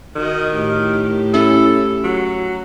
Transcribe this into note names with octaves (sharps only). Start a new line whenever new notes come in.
D#3 F#4 D#5
A2 G4
C#4 E4 A4
F#3